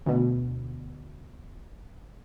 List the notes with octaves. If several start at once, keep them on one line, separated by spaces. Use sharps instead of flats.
D2 B2